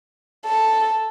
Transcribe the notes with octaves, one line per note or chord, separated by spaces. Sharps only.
A4